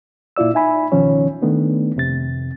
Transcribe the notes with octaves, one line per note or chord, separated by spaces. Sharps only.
A#2 E4 F4 D5 E6
D#4 E5 G#5 B5
C#2 B2 D#3 F3 C#4 C#5
D#3 A3 B3 D4
F2 C3 A6